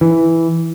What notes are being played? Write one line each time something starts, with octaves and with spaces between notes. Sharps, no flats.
E3